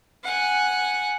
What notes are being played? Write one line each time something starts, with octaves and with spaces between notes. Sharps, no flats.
F#5 G#5